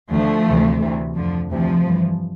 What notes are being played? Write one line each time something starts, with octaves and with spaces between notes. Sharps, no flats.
D2 D3 F3 A3
D2 C3 E3
D2 C3 E3
F2 D3 F3
D2 C3 E3 F3
G2 E3